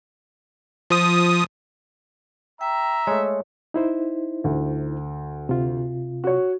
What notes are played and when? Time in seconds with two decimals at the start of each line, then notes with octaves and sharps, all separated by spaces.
0.90 F3 D#6
2.61 E5 G5 A#5
3.07 G#3 A3 C#5
3.74 D#4 E4 C5
4.44 D2
5.49 C3 F4
6.24 F#4 C#5